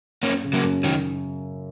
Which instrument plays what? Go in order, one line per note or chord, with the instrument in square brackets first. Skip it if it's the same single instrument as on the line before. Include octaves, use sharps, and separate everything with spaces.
[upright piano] F#2 [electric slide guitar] A#3 C#4
[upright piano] C#3
[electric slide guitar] F#3 A#3
[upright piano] F#2
[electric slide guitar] D#3 F#3